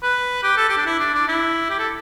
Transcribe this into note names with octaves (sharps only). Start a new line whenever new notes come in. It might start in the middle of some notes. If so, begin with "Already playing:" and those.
B4
G4
A4
G4
D4
E4
D4
D4
E4
G4
A4